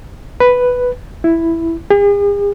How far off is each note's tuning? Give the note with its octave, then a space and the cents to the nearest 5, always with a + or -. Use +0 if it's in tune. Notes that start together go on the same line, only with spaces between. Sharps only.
B4 +0
E4 +0
G#4 -45